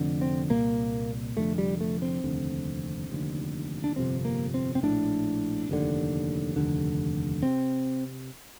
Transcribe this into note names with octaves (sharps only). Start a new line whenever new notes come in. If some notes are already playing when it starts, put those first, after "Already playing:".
Already playing: F1 F2 D3
C4
C2 A#2 A#3
F1 F2 D3 A3
G3
A3
C4
F1 D#2 D3
F1 D#2 D3
D4
G1 F2 C3 C4
A#3
C4
C4
A#1 A2 D4
F1 D#2 D3
F1 D#2 D3
C3 C4